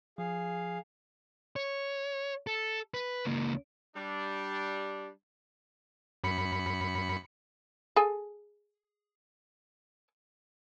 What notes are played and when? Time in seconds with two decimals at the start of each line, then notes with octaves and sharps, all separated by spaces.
0.18 F3 G#4 F5
1.56 C#5
2.47 A4
2.94 B4
3.25 C#2 A#3
3.96 G3 D4
6.24 F#2 B5 C#7
7.96 G#4 A4 G#5